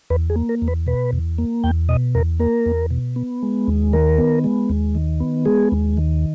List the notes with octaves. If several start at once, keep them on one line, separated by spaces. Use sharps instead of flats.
E2 B4
G#4
A#3
A#4
E2
B4
B2 B4
E2
A#3
E2 G5
B2 D#5
E2 A#4
A#3 A#4
E2
B2
B3
G#3
D#2
D#3 A#4
B3
G#3
D#2
D#3
B3
G#3 G#4
D#2
D#3